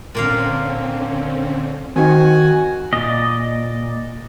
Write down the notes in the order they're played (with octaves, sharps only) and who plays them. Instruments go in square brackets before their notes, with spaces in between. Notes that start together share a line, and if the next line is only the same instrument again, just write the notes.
[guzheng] A#2 A#3 F5 [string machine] D3 C4 C#4
[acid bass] D#3 [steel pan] C4 D#4 [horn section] F#4 [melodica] G#5
[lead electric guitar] A#2 [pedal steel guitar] D5 D#5